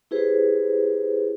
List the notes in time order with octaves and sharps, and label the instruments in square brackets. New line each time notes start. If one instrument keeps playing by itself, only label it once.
[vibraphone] E4 G4 G#4 B4 C5